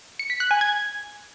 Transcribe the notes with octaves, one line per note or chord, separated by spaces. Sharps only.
C#7
B6
F#6
G#5
G#6